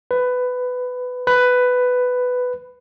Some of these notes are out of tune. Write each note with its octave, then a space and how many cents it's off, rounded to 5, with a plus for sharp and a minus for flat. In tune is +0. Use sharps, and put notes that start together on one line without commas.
B4 +15
B4 +10